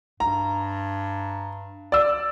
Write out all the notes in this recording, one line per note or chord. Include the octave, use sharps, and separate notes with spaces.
G2 A#5
D5 E6